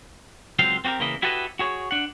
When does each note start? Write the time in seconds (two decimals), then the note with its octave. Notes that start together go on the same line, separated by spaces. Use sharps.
0.59 C#2 F#3 C4 C5 F5
0.85 C4 F#4 G4 A#4
1.00 C#3 E3 A#3 E4 D#5
1.22 E4 F#4 G4 A4 B4 D#5
1.59 F#4 G#4 C#5
1.91 D4 F#5